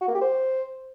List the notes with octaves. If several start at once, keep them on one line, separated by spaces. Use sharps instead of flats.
F#4
A#3
G4
C5